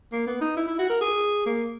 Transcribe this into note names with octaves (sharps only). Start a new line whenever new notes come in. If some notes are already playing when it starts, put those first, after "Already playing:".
A#3
B3
D#4
E4
E4
F#4
A#4
G#4
A#3